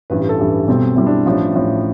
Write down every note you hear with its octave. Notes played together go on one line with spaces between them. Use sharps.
A1 G2 E3 B4
A4
A1 G2 E3
B1 B2 G3 C4
B1 B2 G3 C4 E4
D4
A1 A2 F3 D4
A1 A2 F3